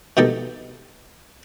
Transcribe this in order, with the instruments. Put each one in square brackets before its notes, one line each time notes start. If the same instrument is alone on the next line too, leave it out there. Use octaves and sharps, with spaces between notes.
[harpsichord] B2 D#3 D#4 G4 A4